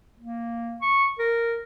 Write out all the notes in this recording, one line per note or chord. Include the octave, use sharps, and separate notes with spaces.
A#3
C#6
A#4